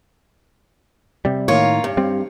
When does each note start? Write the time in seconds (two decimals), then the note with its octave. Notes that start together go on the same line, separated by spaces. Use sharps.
1.25 C3 G3
1.48 A2 D#3 A#3 F4 C#5
1.84 G2
1.97 G3 C4